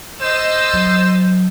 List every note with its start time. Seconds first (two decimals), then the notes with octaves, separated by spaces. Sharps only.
0.22 C5 D#5 E6 A6
0.74 F#3